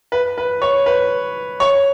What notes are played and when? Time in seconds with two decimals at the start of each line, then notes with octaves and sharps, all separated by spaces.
0.12 B4
0.38 B4
0.62 C#5
0.86 B4
1.60 C#5